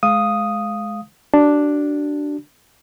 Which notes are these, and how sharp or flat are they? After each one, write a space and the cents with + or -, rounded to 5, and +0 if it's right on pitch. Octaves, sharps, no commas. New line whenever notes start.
G#3 +25 F5 +0 D#6 +0
D4 +0 F#4 +45